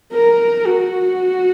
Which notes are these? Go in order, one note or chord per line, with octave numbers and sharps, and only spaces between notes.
A#4
F#4